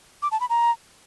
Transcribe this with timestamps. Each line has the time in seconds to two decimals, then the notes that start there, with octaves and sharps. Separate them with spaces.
0.22 D6
0.31 A5
0.40 B5
0.50 A#5